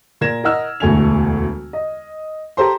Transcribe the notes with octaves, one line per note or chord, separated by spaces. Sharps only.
A#2 A#4 G#6 A#6 E7
A#4 D#5 F#5 E6 F6
E1 D2 A3 G#5 G#6 F7
D#5
G4 A4 C5 A#5 C6